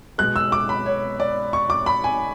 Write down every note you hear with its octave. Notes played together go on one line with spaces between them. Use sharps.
B2 G#3 B3 F#6
E6
D6
B5
C#5
D5
C#6
D6
B5
G#5